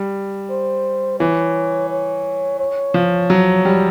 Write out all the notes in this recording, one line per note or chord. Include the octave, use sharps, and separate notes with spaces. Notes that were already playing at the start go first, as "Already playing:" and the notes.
Already playing: G3
C5
E3 C#5
C#5
C#5
F3
F#3
G3